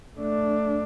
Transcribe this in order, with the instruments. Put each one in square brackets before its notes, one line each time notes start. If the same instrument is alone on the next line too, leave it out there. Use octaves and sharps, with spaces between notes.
[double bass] A3 D4